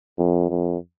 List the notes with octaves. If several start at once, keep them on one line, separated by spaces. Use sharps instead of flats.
F2
F2